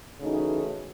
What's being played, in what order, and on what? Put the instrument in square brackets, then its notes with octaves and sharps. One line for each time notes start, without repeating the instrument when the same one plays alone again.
[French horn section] C#3 E3 A3 D#4 F#4